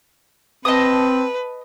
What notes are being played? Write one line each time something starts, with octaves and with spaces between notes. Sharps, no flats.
C4 B4 D#5 A5 D#6